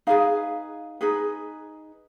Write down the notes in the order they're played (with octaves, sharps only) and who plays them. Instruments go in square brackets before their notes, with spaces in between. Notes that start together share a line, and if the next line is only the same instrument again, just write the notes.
[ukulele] D#4 G#4 B4 F5
D#4 G#4 B4